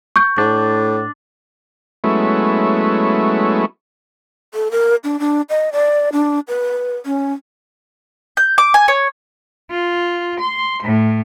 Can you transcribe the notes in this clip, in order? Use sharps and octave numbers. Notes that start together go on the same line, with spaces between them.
C#6 G6
A2 D4
F#3 G#3 A3 B3 C#4 E4
A4
A#4
D4
D4
D#5
D5
D4
B4
C#4
G6
D6
G#5
C#5
F4
C6
A2